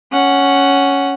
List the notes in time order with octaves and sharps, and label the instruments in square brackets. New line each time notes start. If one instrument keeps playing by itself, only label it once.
[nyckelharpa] C#4 F#5